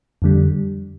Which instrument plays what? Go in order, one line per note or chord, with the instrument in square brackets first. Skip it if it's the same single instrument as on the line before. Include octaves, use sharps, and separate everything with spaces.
[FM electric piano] F2 D3 G3